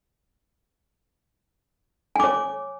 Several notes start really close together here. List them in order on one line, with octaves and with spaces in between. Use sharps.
G#5 D6 C#5